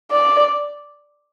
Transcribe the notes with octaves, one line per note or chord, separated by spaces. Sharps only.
D5